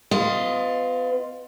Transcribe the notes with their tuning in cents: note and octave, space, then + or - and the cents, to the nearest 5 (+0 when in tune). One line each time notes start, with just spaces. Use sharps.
B3 +40 F4 +0 D#5 +0